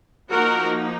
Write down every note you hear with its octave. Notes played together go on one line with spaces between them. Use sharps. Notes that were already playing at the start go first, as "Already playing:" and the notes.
F3 A#3 D#4 F#4 A#4